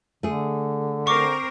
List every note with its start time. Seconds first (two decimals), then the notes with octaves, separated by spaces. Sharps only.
0.23 D3 A3 G#4
1.07 C4 A#4 C5 C#6 D6